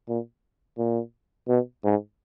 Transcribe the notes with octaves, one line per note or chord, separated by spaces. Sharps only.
A#2
A#2
B2
G#2